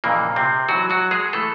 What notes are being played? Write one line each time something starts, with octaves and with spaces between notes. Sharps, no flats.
F2 A#2 C#3 E3 A#3
C3 C4
G#2 E3 F#3 F#4
F#3 F#4
G#3 G#4
E3 A3 A4